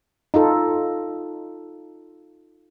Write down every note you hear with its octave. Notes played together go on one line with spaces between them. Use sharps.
D#4 F4 A4